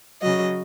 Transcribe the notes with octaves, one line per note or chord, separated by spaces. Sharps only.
C#3 F#3 D#5